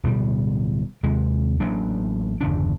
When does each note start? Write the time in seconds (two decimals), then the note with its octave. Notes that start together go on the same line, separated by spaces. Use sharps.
0.04 D1 B2 G3
1.03 D#2 C3 G#3
1.60 A1 F#3 A#3 D4
2.41 G1 E2 C#3 D4